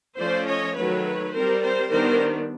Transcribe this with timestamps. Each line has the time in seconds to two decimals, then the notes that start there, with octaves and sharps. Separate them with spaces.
0.19 F3 A3 C#4 C5 D5
0.47 C#5 D#5
0.76 D#3 F#3 A3 B4 C#5
1.34 G3 C4 A#4 C5
1.63 A#4 C5
1.91 D#3 G3 B3 D4 A#4 C5